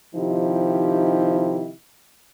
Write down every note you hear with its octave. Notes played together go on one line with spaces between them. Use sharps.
C3 D#3 F3 D#4 E4 G4